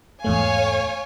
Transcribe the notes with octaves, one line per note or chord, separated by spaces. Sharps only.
E2 G#2 A3 C#5 F5 G#5